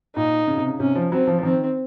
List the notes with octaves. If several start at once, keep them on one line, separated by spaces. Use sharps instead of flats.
A#2 D#4
C#3
C3
C#3
C3 C#4
F3
F#3 C4
F3
F3
D#3 C4